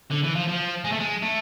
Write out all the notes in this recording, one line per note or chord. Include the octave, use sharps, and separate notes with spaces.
D3
E3
F3
F3
G#3
A3
G#3
A3